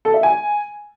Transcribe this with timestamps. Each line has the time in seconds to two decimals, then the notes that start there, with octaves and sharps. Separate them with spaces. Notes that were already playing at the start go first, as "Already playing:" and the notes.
0.05 A4
0.14 E5
0.23 G#5